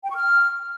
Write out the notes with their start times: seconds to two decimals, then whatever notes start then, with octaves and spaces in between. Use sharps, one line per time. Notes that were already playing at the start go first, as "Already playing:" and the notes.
0.04 G5
0.10 C#6
0.16 F6